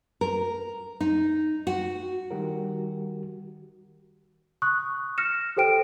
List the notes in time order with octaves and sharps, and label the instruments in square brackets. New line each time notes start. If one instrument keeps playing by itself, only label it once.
[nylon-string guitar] A#4
D#4
F#4
[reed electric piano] D#3 G3 F#4 G4 A#4
[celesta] C#6 D#6 F#6
F6 A#6 C#7 E7
G4 A4 C5 G5 D7